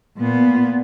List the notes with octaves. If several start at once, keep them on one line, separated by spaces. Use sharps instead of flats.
A#2 B3